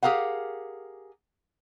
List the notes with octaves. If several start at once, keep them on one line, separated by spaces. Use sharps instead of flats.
G4 G#4 A#4 F5 F#5